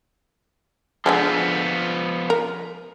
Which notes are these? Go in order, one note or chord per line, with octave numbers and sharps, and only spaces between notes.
D3 F3 G#3 B3 A4
A#4